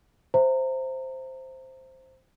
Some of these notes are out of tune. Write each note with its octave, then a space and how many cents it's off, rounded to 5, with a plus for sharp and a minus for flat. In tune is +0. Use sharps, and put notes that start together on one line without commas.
C5 +0 E5 +10 A#5 -25